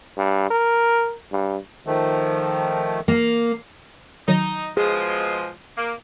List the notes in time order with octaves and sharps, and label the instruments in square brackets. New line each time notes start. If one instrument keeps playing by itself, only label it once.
[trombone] G2
A#4
G2
[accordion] D#3 F3 A3
[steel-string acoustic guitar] A#3
[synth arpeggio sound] D#3 F#3 [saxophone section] D#4
[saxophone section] B2 F3 G#3 [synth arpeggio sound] G#4
[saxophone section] A#3